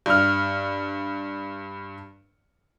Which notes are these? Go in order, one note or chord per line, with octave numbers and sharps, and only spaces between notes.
G2 F6